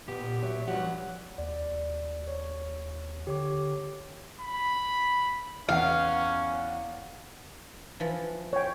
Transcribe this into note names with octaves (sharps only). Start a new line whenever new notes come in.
A#2 B3 G4
F#3 E5
G2 F3 F#3 G4 F#5
D#2 D5
C#5
D3 G4 C#5 D6
B5
E2 B3 C#4 F5 F#5
E3 F3
C#5 G5